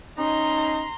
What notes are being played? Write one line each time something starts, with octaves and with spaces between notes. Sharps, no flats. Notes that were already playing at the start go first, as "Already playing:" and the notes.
C#4 D#4 A#5 C6